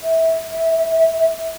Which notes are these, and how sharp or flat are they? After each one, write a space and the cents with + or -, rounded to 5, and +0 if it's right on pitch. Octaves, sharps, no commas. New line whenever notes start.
E5 -25